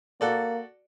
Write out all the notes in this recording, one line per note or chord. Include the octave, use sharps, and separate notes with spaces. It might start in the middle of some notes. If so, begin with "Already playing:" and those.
A#3 F#4 A4 D5